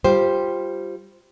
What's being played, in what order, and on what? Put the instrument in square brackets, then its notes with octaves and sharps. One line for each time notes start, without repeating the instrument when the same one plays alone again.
[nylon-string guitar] G3 F4 G4 C5